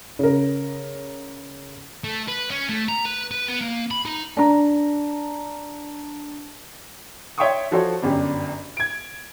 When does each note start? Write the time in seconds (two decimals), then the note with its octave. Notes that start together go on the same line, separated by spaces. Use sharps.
0.19 C#3 A#4
2.04 A3
2.28 B4
2.50 C#4
2.69 A3
2.89 A#5
3.05 B4
3.31 B4
3.48 B3
3.61 A#3
3.91 B5
4.05 D#4
4.37 D4 A#5
7.38 C#5 E5 G5 C6 C#6 D#6
7.71 F3 F#4 A4 C5 C#5
8.02 G1 F#2 D4 G4
8.77 G#6 D7